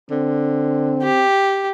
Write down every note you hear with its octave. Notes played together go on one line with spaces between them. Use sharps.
D3 C4
G4